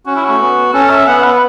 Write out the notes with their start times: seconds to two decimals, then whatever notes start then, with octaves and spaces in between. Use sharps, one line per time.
0.06 C#4 F#4
0.16 E4
0.25 A3 F#4
0.41 B3
0.74 C#4 A4
0.90 E5
1.07 B3 F#5
1.24 B4